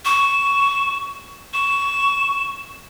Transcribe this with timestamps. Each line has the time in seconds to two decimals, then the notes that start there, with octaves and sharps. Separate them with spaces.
0.05 C#6 E7
1.53 C#6 E7